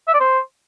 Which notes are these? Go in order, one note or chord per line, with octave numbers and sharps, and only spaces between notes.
E5
D5
C5